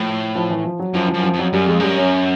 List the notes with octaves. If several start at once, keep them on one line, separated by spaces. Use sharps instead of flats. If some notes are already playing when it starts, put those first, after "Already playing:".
Already playing: A2 F3
F3
E3
F3
F#3
F#2 F3
F3
F#2
F3
F2
F#3
F#2 G3
F2 G#3
F#2 G3
C#4